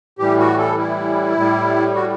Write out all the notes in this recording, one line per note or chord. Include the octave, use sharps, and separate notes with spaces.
A2 E3 G3 G4
F#4
A4
E4
A2 G3
F#4